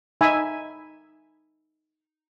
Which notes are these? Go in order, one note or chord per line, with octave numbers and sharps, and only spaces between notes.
D#4 E5 G#5 B5